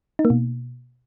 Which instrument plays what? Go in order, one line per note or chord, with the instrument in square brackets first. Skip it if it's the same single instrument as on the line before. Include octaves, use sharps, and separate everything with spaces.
[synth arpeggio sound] D#4
A#3
B2